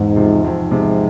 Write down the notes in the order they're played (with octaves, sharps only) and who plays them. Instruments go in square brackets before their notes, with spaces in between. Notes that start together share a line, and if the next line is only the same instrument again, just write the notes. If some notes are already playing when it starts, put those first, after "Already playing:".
Already playing: [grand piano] E2 [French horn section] G#2
[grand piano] C3 F3
[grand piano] F2 [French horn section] G#2
[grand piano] C3 F3 G#3